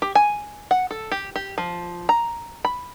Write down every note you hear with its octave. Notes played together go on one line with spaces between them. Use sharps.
G4
G#5
F#5
A4
G4
G4
F3
A#5
B5